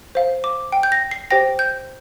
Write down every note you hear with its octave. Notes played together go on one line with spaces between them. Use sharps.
C5 F5
D6
G5
G6
A#6
C7
G4 C5 G5 A#6
G6